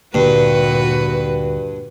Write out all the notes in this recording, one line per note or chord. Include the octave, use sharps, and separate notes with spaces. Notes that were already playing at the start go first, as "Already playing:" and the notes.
D2 G2 A#2 D3 A#3 F#4 B4